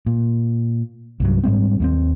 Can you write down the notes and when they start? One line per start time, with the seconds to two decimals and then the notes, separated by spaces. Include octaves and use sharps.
0.06 A#2
1.20 C2 G2 F#3
1.43 G#2 G3 G#3 C4
1.80 D#2 A#3 C4